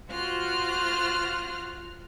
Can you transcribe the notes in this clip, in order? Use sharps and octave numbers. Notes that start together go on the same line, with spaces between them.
F4 F#4 C5 F6 F#6